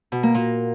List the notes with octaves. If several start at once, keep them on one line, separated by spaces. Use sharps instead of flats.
B2
A#3
A#2